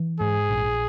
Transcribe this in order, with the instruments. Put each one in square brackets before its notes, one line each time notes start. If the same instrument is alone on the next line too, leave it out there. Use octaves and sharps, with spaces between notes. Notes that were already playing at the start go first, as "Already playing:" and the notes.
Already playing: [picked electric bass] E3
[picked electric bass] G#2 [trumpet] G#4
[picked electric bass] A#1